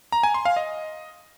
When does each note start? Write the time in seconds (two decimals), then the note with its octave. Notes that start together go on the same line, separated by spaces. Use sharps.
0.12 A#5
0.23 G#5
0.34 C6
0.45 F5
0.56 D#5